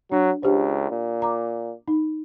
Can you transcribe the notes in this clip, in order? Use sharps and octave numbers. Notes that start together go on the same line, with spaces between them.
F#3 D4
C#2 D4 G4 C5
A#2
A#5 D6
D#4